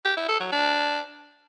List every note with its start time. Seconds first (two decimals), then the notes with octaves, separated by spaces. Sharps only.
0.05 G4
0.17 E4
0.28 A4
0.40 F#3
0.52 D4